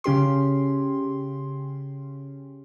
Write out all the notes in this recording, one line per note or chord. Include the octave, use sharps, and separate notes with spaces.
C#3 C#4 G4 C6